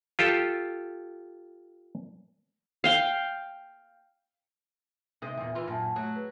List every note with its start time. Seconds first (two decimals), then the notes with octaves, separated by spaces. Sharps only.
0.19 F4 G4 A4
2.84 F5 G5
5.22 C3 G#3 D#5
5.37 E2 A#2
5.55 E3 F4
5.67 F#2 A#2 F#5 A5
5.96 F#3 A3
6.15 G#4 B4